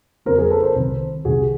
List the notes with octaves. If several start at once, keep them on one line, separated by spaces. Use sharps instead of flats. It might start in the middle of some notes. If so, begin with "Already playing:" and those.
F2 C#3 F#3 B3 A#4 C5
G#4 A#4
A4 B4
A#4 C5
C2 C3 D#3
C2 C3 D#3 F#4 G#4